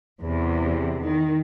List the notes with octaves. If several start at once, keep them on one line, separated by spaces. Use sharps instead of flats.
E2 C3
D#3